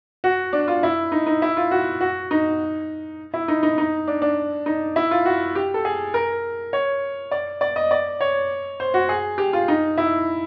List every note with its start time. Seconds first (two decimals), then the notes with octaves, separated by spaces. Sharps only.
0.24 F#4
0.53 D4
0.68 F4
0.83 E4
1.12 D#4
1.26 D#4
1.42 E4
1.57 F4
1.71 F#4
2.01 F#4
2.31 D#4
3.34 E4
3.48 D#4
3.63 D#4
3.78 D#4
4.07 D4
4.22 D4
4.66 D#4
4.96 E4
5.11 F4
5.25 F#4
5.55 G4
5.74 A4
5.85 G#4
6.14 A#4
6.73 C#5
7.31 D5
7.61 D5
7.76 D#5
7.91 D5
8.21 C#5
8.80 C5
8.94 F#4
9.09 G#4
9.38 G4
9.53 F4
9.68 D#4
9.97 E4